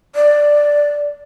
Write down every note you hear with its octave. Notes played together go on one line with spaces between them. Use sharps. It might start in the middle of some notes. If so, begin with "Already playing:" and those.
D5